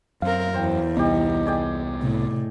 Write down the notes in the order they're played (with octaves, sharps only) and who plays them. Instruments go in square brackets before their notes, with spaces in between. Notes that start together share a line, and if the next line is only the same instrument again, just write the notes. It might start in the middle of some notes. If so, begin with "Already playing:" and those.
[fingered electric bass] F#2 [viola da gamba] C4 A#4 [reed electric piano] F5
[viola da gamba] E2 [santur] C5 G5
[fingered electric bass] C2 B3 [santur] D#4 G4
[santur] G#4 D5 G5
[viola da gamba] A2 [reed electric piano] C3